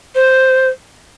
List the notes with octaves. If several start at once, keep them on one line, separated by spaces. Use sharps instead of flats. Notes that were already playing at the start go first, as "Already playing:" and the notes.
C5